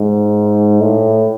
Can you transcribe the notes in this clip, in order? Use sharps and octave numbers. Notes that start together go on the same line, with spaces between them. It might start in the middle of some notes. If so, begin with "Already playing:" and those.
Already playing: G#2
A2